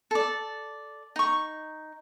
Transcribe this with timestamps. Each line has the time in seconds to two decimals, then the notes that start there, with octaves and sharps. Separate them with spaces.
0.11 A4 D5
1.16 D#4 C#6